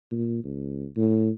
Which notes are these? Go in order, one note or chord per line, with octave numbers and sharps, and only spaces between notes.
A#2
C#2
A2